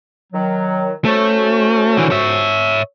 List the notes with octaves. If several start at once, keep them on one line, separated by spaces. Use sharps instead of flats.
D#3 F#3
A3 C#4 F#4 C5
D3 E3
C#5 E5